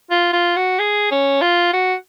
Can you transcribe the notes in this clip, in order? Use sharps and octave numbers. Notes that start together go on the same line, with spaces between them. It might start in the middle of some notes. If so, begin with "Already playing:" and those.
F4
F4
F#4
G#4
C#4
F4
F#4